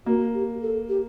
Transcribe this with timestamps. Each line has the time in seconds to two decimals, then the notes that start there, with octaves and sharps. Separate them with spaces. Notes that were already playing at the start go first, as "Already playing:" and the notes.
0.06 A#3 F#4
0.34 G4
0.62 A4
0.89 G4